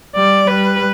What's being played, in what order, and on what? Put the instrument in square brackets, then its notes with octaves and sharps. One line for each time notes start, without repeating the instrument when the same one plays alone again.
[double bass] G3 [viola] D5
[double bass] G3 [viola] B4